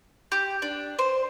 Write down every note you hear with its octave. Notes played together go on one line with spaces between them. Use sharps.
G4
D4
C5